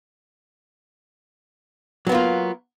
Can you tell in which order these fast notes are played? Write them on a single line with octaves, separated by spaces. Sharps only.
F#3 B3 A#3 F4